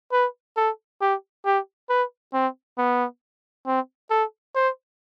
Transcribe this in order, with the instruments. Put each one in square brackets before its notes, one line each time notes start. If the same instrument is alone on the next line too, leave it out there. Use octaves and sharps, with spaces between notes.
[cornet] B4
A4
G4
G4
B4
C4
B3
C4
A4
C5